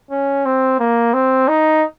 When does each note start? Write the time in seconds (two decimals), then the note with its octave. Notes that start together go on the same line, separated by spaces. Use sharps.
0.11 C#4
0.45 C4
0.80 A#3
1.13 C4
1.48 D#4